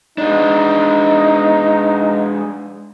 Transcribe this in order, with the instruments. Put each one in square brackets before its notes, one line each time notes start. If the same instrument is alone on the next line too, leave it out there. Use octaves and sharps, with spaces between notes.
[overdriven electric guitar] G#3 D4 [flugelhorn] D#4